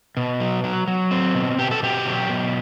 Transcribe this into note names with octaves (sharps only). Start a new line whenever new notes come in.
B2
F#3
F#3
F#3
C4
B2
B2 G4
A4
B2 G4
F#3
B2